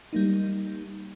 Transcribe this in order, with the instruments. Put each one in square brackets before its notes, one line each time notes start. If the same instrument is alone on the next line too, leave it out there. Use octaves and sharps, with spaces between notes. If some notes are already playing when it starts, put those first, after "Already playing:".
[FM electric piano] G3 A#3 D#4